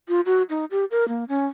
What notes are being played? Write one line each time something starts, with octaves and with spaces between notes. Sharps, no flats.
F4
F#4
D#4
G4
A#4
A#3
C#4